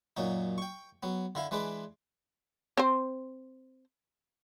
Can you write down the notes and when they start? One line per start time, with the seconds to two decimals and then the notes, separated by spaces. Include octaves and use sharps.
0.17 F#2 A#2 F#3 D#4
0.58 G5 C#6
1.03 F#3 B3
1.35 D3 E4 F5
1.51 E3 G#3 D4 B4 D6
2.77 C4 C5